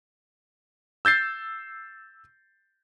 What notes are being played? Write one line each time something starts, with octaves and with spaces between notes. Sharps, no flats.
E6 G6 A6 C7